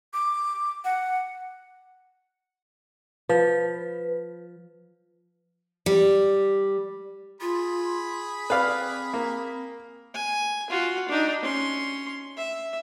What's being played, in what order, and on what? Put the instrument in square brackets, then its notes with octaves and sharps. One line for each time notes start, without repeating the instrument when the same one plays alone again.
[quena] D6
F#5
[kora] F3 [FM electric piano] B4
[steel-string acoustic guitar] G3
[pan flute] F4 [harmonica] G#4 B5
[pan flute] C4 [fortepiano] B4 D5 F5
[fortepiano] A#3
[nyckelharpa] G#5
F4 F#4
D4 D#4
C#4 C6
E5